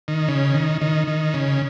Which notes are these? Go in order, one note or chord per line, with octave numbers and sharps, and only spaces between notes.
D#3
C#3
D#3
D#3
D#3
C#3